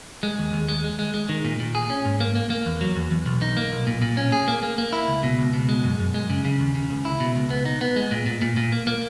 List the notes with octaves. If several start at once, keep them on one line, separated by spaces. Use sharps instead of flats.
G#3
D#2
D#2
G#3
G#3
G#3
G#3
D#3
A#2
A#2
G#4
C#4
G#2
A#3
A#3
A#3
E2
F#3
E2
E2
B1
D#4
A#3
B1
A#2
A#2
C#4
G#4
A#3
A#3
A#3
E4
C#2
B2
C#2
B2
G#3
F#2
F#2
G#3
C#3
C#3
D#2
C#3
C#2
E4
B2
C#2
B3
D#4
B3
G#3
A#2
A#2
A#2
A#2
A#3
A#3